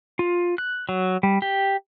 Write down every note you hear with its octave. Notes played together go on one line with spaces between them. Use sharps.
F4
F#6
F#3
G3
G4